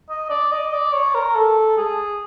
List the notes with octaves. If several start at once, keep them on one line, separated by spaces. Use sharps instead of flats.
D#5
D5
D#5
D5
C#5
A#4
A4
G#4